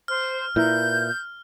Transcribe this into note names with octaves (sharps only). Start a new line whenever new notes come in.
C5 F6
A#2 E4 A#4 B4 G6